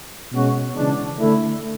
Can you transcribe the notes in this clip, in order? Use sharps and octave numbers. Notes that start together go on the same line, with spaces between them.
B2 G#3 C#4 F#4
C#3 E3 G#3 D4
D3 A3 E4